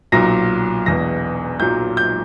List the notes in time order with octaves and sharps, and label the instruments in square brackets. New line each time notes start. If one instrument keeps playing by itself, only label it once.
[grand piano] B1 A#2 F#3 A#6
E1 E2 B2 A#6
B1 A#2 F#3 G6
G6